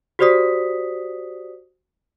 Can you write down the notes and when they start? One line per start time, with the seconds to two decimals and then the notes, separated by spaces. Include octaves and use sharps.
0.19 F#4 G4 C5 D5 D#6 B6